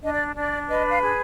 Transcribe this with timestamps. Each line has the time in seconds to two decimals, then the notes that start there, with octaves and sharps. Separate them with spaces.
0.02 D4 D#5
0.13 D5
0.34 D4 D5
0.68 B4 D#5
0.90 F5
1.01 G#4